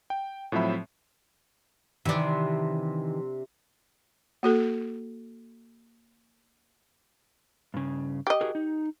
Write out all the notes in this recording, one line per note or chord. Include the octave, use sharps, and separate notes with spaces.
G5
A2 F3 F#3 C4 E5 B5
C3 D#3 E3 D4
A#3 F#4 A4
G2 C#3
G4 D#5
F#4 G#4 A#4
D#4